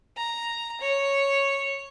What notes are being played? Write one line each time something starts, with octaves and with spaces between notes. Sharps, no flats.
A#5
C#5